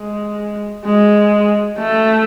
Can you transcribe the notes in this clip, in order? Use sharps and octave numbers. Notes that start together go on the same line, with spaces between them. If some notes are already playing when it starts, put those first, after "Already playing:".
Already playing: G#3
G#3
A3